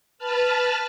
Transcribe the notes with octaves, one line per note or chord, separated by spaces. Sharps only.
B4 A5 F6